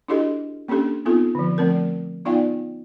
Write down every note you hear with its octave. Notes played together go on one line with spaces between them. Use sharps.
D4 E4 F#4 G4 A4 D#5
A#3 C#4 D4 G4 A4
B3 C4 D#4 F4 A4
D3 F3
F3 A3 C4 A#4
B3 D#4 F4 D5 F5 G5